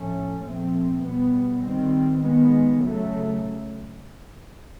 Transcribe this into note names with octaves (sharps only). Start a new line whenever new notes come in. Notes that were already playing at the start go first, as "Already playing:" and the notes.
Already playing: A2 F3 A3 C#4
A#2 F3 A3 C4
B2 G3 B3
D#3 G3 C4
D#3 G#3 B3
C#3 F#3 A3